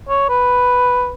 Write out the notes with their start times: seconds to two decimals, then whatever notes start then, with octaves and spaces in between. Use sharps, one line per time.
0.08 C#5
0.29 B4